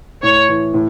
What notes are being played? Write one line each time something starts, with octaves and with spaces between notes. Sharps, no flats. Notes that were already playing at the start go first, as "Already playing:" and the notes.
A2 C#5
E3
A2